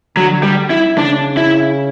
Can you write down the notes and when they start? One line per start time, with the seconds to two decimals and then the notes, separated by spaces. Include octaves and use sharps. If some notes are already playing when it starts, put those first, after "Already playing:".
0.17 D3 F#3
0.43 G3
0.70 E4
0.97 C#3 D4
1.37 E4